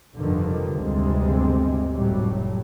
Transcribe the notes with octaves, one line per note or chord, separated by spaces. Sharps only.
F1 G2 D3 D#3 F3
G1 D2 C3 G3 G#3 C4
F1 A2 F#3 G3